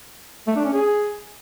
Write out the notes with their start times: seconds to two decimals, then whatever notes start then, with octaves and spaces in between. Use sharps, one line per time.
0.47 A3
0.56 D4
0.64 C#4
0.73 G#4